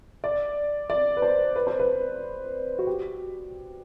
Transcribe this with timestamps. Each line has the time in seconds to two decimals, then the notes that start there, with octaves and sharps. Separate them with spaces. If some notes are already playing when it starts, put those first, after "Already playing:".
0.24 D5
0.90 D5
1.17 B4
1.22 C5
1.56 B4
1.67 C5
1.80 B4
2.79 F#4
2.87 G4